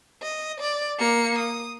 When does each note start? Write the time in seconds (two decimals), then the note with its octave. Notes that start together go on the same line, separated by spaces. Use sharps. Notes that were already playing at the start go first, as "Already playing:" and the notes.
0.22 D#5
0.60 D5
0.98 A#3 C#7
1.38 D#6